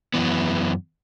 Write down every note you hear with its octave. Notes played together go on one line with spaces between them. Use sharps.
F#2 E3 B3